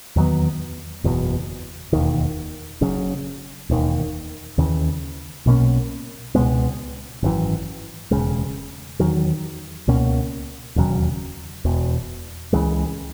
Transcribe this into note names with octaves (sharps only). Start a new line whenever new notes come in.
E2 D#3 F#3 B3
F#1 E2 B2
E1 D#2 D#3
F#1 F#2 C#3
E1 D#2 D#3
D#2 C#3 E3
B1 B2 A#3 C#4
C#2 B2 G#3 B3
G#1 F#2 E3
E1 D#2 C#3 G#3
E2 D#3 F#3
C#2 B2 A#3 C#4
E1 D#2 C#3 F#3
E1 E2 B2
C#2 C#3 E3 G#3